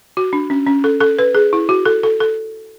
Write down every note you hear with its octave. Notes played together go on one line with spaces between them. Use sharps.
F#4
D4
C#4
C#4
A4
A4
B4
G#4
E4
F#4
A4
A4
A4